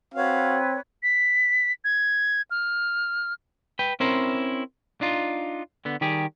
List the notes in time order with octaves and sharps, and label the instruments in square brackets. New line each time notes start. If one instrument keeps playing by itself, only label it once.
[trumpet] C4 [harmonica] F#4 F5 [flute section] B4 C#5
[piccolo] B6
G#6
F6
[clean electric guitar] B4 G5
C4 C#4 E4 A#4 C5
D4 D#4 F4
D3 B3
D#3 G3 G4 G#4